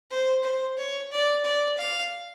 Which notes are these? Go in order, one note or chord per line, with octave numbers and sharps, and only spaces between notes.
C5
C5
C#5
D5
D5
F5